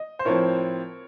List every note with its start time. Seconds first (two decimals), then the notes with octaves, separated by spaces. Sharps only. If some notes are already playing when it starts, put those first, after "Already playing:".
Already playing: D#5
0.19 C5
0.25 A2 F3 C4 A#4 C#5